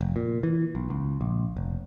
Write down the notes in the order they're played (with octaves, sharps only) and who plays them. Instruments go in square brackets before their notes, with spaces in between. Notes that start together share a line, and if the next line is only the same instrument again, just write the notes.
[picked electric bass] F1
A#2
E3
B1
C#2
A#1
F1